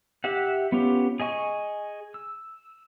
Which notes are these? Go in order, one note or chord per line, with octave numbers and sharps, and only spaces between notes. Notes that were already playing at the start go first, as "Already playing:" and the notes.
G4 E5 F#5
B3 C#4 F4 G4
G#4 D#5 G#5 C#6
E6